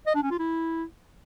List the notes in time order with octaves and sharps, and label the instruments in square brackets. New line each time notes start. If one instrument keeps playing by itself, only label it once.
[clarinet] D#5
D4
C#4
F4
E4